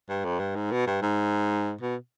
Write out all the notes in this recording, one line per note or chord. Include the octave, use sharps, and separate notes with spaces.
G2
F2
G2
G#2
B2
G2
G#2
B2